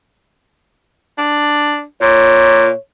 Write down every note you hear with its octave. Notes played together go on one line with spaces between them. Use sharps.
D4
A#2 C#5